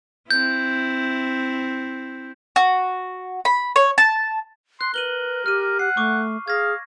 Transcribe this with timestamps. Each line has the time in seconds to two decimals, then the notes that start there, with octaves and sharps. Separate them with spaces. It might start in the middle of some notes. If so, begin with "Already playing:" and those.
0.31 C4 E4 G6
2.56 F#4
3.45 B5
3.76 C#5
3.98 A5
4.81 C6 F#6
4.94 A#4 B4 D#7 F#7 G7
5.46 G4 F6 D#7
5.79 F#5 C7
5.97 A3 C#6 D6
6.48 G#4 F5 G#6 A#6